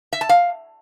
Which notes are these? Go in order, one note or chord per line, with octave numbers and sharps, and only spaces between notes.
E5
A5
F5